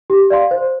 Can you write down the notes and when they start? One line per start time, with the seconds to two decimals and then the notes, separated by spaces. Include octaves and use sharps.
0.10 G4
0.30 D5 F5 C6
0.51 C5